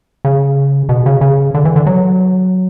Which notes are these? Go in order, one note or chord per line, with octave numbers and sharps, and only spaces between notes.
C#3
B2
C#3
C#3
D3
E3
D3
F#3